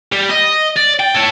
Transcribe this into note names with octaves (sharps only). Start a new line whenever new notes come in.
G3
D#5
D5
G5
A4 C#5